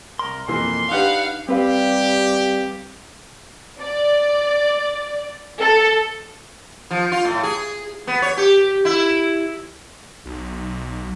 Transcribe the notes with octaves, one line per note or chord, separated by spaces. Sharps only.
C2 A#4 C6
F2 B2 E3 A#3 C6
D4 D#4 G4 B4 F5 F#5
G3 C4 G4 B4 F5
D5
A4
F3
F4
A2
G#4
B3
C#5
G4
E4
B1